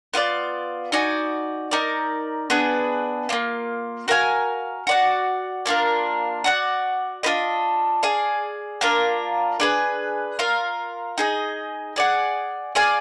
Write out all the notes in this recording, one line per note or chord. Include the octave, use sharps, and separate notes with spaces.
B3 F4 B4 D5
D#4 F#4 D5 G#5
D#4 A#4 D5
B3 D4 G#4 B4
A#3 D4 F4
F#4 A#4 F5 G#5
F#4 D5 F#5
A#3 D4 F4 A#4
F#4 D5 F#5
D4 F4 B4 D#5
G#4 D5 F5
A#3 D4 F4 A#4
D4 G#4 B4
F4 A#4 F5
D#4 G#4 D#5
G#4 D5 F#5
G#4 D5 F5 G#5